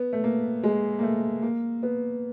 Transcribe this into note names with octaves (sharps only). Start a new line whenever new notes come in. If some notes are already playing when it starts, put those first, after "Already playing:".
Already playing: B3
A3
A#3
G#3
A#3
A3
A#3
B3